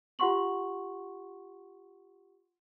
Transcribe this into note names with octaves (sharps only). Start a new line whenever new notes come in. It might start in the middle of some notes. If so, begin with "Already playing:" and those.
F4 G4 F#5 C6 C#6 F#7